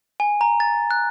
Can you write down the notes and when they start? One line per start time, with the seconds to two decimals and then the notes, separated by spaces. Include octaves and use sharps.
0.20 G#5
0.41 A#5
0.60 A6
0.91 F#6